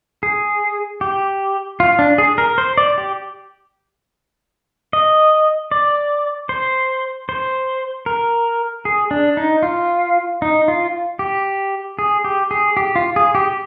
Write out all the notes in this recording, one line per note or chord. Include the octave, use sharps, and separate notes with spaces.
G#4
G4
F4
D4
G#4
A#4
C5
D5
G4
D#5
D5
C5
C5
A#4
G#4
D4
D#4
F4
D#4
F4
G4
G#4
G4
G#4
G4
F4
G#4
G4